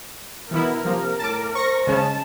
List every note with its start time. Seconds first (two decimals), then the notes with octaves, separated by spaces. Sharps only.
0.51 B2 E3 B3 E4 A#4
0.85 C3 F3 A#3
1.19 A2 A5 D6
1.55 C5 C#6 A#6
1.87 C#3 G#3 C#4 A5